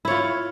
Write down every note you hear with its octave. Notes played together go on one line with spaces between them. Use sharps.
E4 F4 C#5